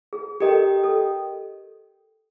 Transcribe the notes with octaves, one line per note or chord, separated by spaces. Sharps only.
G#4
G4 A4 A#4 D#5 G5
A4